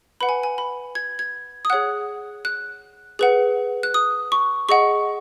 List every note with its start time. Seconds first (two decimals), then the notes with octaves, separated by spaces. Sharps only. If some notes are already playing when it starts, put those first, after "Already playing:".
0.21 B4 F#5 B5
0.29 G#5
0.43 G#5
0.58 B5
0.95 G#6
1.19 G#6
1.65 D#6
1.70 G#4 C#5 F#5 F#6
2.45 F#6
3.19 G#4 B4 F#5
3.83 F#6
3.94 D#6
4.32 C#6
4.69 G#4 D#5 F#5 C#6